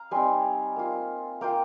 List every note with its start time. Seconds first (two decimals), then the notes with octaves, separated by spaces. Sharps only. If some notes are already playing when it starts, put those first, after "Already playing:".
Already playing: F5 A#5
0.11 G3 C4 D#4 G#5 C6
0.76 A#3 F4
1.41 A#3 F4 G5 A#5